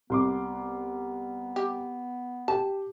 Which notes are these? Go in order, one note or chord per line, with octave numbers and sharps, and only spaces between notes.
C2 B3 C6 D6
G4
G4 G5 A5